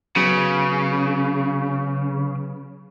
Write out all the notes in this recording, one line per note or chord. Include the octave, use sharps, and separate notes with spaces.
C#3 F#3 B3 C#4